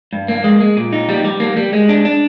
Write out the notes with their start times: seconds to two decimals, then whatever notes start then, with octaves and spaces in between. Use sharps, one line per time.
0.13 G2
0.28 A#3
0.44 G#3
0.60 G#3
0.77 A#2
0.92 D#4
1.09 G3
1.24 G3
1.40 A#3
1.57 G3
1.73 G#3
1.89 D4
2.05 D4